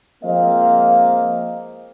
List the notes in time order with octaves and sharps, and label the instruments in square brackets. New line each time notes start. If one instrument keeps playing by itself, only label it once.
[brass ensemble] F3 G#3 A#3 C4 D#5 F5